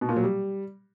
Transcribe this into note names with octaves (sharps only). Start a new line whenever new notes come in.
B2
A#2
F#3
G3